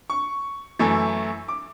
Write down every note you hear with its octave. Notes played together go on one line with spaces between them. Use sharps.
C#6
F#2 E3 A3 E4
D6